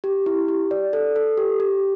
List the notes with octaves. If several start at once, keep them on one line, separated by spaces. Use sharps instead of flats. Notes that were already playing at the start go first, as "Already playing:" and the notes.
G4
E4
G4
D5
A4
A4
G4
G4